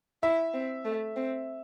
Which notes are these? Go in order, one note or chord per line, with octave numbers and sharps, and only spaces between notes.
E4 E5
C4
A3
C4